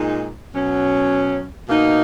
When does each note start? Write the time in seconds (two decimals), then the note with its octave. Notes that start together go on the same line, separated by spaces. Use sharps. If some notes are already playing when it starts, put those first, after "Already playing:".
Already playing: A#2 G#3 D#4
0.54 B2 F#3 C#4
1.68 B2 A#3 D#4